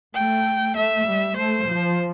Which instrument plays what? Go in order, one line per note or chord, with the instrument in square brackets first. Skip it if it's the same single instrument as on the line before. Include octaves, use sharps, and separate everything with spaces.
[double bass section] A3 [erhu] G5
[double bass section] A3 [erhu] E5
[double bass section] G3
[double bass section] A3 [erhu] C5
[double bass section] F3